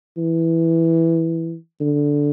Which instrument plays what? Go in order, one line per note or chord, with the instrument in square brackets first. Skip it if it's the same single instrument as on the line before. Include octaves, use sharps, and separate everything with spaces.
[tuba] E3
D3